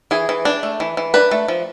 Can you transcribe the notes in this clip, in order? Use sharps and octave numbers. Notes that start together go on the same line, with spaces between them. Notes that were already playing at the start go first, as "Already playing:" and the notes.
E3 G#4
E3
D4
A3
E3
E3
D4 B4
A3
F3